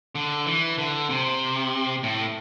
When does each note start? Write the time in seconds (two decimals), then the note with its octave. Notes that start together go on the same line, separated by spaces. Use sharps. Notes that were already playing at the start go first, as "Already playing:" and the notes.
0.15 D3
0.46 E3
0.78 D3
1.10 C3
2.03 A2